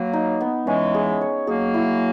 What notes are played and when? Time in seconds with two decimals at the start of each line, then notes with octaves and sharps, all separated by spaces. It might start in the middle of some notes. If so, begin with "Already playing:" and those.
Already playing: F#3 A#3 B4
0.13 D#4
0.41 B3
0.66 E3 G#3 C#4
0.94 G#4
1.21 C#5
1.47 F#3 A#3 G#4
1.74 E4